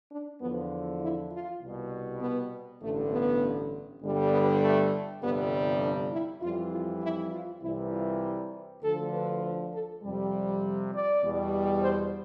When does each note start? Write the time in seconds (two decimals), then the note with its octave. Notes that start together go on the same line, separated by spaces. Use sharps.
0.12 D4
0.42 E2 D3 F3 B3
1.01 E4
1.31 F4
1.62 C2 B2 G3
2.21 B3
2.82 A1 G2 D3 A3
3.12 B3
4.02 G1 G2 D3 G3
4.31 B3
4.62 A3
5.22 G1 F2 C3 G3 B3
5.81 D4
6.12 E4
6.41 F2 E3 G3 F4
6.72 F4
7.02 E4
7.32 F4
7.62 C2 C3 E3 G3 E4
7.91 F4
8.82 D2 D3 F3 A4
9.12 B4
9.73 A4
10.02 F2 C3 G3
10.93 D5
11.22 E2 B2 G3
11.82 C5